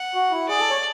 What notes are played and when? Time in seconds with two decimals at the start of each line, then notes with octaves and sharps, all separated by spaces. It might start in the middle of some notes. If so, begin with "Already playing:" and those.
Already playing: F#5
0.15 F#4
0.31 E4
0.48 G#4 D5
0.59 A4
0.70 C#5